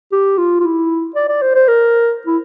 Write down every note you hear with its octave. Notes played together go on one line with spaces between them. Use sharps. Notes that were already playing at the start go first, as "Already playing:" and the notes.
G4
F4
F4
E4
D5
D5
C5
C5
A#4
E4